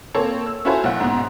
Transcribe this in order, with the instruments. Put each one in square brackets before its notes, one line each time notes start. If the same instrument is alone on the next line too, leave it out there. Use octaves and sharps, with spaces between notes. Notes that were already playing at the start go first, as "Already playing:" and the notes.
[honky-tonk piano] A#3 C4 A4 C#5
E6
C#4 E4 F#4 A4 C5 C#5
B1 F#5
G#2 B2